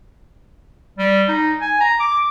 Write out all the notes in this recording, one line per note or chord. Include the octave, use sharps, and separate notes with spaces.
G3
D#4
G#5
A#5
D6